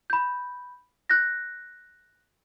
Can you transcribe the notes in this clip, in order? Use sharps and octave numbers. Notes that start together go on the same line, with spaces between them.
B5 G6
F#6 G6 A#6